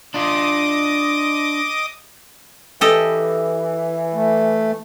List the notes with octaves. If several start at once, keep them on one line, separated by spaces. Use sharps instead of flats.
D4 F4 D#5 D6 D#6
E3 G4 A4 D#5
A3